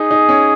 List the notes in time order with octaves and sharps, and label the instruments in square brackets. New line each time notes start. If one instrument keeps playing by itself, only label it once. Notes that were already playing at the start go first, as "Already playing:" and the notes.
Already playing: [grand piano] D#4 [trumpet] G#4
[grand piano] D#4
C#4